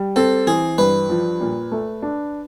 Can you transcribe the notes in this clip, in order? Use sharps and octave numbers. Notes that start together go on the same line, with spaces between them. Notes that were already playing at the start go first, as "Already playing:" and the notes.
Already playing: G3
C4 A4
E3 G#4
G2 B4
F3
A#2
A3
D4